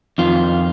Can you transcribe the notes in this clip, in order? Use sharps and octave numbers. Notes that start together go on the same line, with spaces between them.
F2 D#3 F4